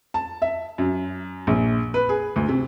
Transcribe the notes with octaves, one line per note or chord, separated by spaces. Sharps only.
A5
E5
F#2
A#1
B4
G#4
D2
C3